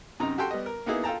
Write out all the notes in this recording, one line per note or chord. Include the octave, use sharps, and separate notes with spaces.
F#2 C3 D#4 A#5
F#4 G4 A4 G5 C6
G3 B3 D#5
A#4
A#3 B3 D#4 E4 G#4
F4 A4 G5 A5 A#5